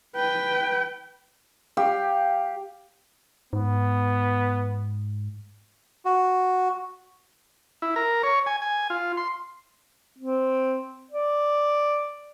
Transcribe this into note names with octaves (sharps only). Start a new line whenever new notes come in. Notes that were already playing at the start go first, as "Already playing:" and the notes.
B4 G5
G4 F5
G#2 B3
F#4
E4
A#4
C#5
G#5
G#5
F4
C6
C4
D5